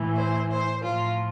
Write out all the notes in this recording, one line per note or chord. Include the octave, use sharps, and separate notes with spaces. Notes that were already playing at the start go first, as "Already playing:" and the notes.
Already playing: A2 E3
C5
C5
A2 F3 F4